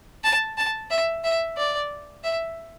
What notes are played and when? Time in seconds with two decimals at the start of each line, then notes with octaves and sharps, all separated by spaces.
0.24 A5
0.57 A5
0.90 E5
1.24 E5
1.57 D5
2.24 E5